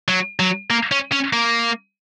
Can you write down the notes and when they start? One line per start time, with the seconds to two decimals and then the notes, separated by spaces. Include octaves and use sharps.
0.08 F#3
0.40 F#3
0.70 A#3
0.92 C#4
1.12 C#4
1.33 A#3